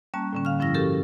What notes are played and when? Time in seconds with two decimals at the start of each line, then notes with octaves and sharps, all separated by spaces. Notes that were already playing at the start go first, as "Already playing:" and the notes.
0.14 G3 A#3 C#4 A5 F#6
0.33 A2 D3 C#4
0.45 F5 F6
0.59 G2 F3 C#4 E4 A#6
0.74 C#4 F#4 G4 A4 A#4